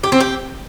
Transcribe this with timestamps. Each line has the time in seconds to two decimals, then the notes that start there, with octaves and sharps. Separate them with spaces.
0.03 G4
0.12 C4
0.20 G4